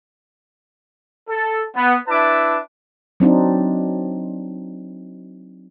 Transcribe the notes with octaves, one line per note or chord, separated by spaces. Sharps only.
A4
B3
D4 E4 B4 E5 A5 D6
F#3 C4 D4 D#4